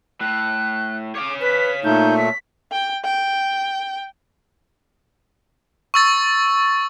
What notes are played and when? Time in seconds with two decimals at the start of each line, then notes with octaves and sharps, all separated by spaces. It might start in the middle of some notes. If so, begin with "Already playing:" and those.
0.21 A2 F#6
1.15 C#5 F5 D6
1.41 B4 B6
1.84 A#2 A3 D#4 G6
2.18 B6
2.72 G5
3.04 G5
5.94 C#6 E6 A6